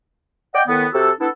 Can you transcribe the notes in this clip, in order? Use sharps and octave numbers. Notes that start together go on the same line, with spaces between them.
D5 D#5 F#5 G5
A2 D#3 B3
C3 F#4 A4
B3 D4 E4 A4